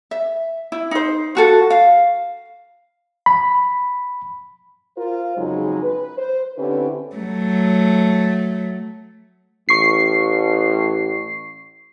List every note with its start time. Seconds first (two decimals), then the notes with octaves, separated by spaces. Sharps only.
0.11 E5
0.72 E4
0.91 D#4 C5
1.35 F4 F#4 A4
1.70 F5
3.26 B5
4.96 F4 A#4 C5
5.36 F2 C#3 F#3 G#3 D#4 G#4
5.83 B4
6.17 C5
6.57 D3 C4 C#4 E4 G4 B4
7.16 F#3 A3
9.69 A1 C#6 C7